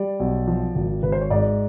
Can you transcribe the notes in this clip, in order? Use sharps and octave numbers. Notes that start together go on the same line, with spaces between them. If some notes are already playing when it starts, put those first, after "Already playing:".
Already playing: G3 D5
B1
F3
G#1
G#1 B4
C5
C#5
G#2 D5